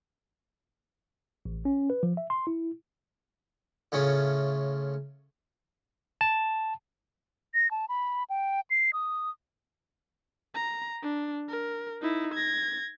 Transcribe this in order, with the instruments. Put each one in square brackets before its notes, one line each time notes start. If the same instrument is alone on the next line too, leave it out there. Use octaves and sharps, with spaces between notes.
[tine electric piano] A1
C#4
B4
F3
E5
C6
E4
[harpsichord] A2 C#3 C#4 F4
[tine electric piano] A5
[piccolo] A#6
A5
B5
G5
C7
D#6
[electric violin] A#5
D4
A#4
D#4 E4
G#6 A#6